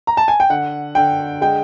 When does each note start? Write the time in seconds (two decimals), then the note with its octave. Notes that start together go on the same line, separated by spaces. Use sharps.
0.07 A#5
0.17 A5
0.28 G#5
0.40 G5
0.49 D3 F#5
0.95 D3 G5
1.41 G#3 G5